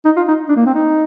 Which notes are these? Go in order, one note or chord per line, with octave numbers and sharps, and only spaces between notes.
D#4
F4
D#4
D4
A#3
C4
D#4